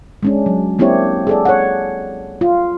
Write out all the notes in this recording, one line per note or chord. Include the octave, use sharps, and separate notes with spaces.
G#3 C#4 D4
F#3
A#3 C4 D4 E4 G4 C#5
G#4 A4 D5
C#5 F#5
F4